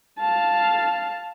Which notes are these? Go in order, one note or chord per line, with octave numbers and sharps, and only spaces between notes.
F5 A5